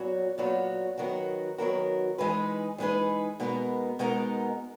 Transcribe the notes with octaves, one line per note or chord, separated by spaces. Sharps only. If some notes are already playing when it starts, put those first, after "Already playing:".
Already playing: A#2 F#3 B3 F#4 C#5
A#2 F#3 B3 F#4 C#5
D#3 F#3 B3 F#4 A#4
D#3 F#3 B3 F#4 A#4
E3 G#3 D#4 G#4 B4
E3 G#3 D#4 G#4 B4
B2 G#3 B3 D#4 A#4
B2 G#3 B3 D#4 A#4